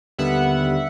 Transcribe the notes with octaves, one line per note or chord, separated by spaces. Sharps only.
D#2 D3 G3 B3 E5 F#5